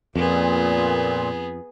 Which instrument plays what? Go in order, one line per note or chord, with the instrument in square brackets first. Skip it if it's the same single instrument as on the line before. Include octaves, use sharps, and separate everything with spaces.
[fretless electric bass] F2 [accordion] A#2 [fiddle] B3 G#4